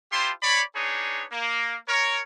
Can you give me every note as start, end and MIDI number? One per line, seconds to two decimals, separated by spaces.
0.12 0.32 64
0.12 0.32 65
0.12 0.32 67
0.12 0.32 72
0.12 0.32 81
0.12 0.32 84
0.43 0.62 73
0.43 0.62 74
0.43 0.62 83
0.75 1.24 62
0.75 1.24 63
0.75 1.24 68
0.75 1.24 71
0.75 1.24 73
1.32 1.77 58
1.88 2.21 70
1.88 2.21 73